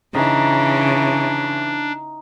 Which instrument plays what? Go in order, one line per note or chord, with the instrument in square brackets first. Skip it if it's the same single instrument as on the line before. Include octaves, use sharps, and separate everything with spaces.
[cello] C#3 [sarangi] E3 [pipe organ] D4 [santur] D#4